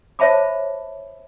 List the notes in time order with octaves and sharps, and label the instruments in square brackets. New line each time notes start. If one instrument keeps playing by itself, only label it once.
[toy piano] C5 C#5 E5 A5 B5 D6